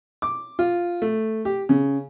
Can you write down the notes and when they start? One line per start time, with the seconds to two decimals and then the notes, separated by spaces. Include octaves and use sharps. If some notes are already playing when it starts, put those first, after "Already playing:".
0.22 D6
0.59 F4
1.02 A3
1.45 G4
1.69 C#3